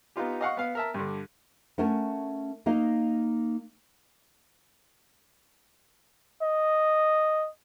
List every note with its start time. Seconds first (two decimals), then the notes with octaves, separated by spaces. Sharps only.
0.16 B3 D#4 F4 G4
0.41 D#5 F5 F#5 C#6
0.57 B3 F5
0.75 A#4 E5 A5
0.94 G2 D3
1.78 A3 C#4 A#4 F#5 G#5 A5
2.66 A#3 D#4 D#5 F5
6.42 D#5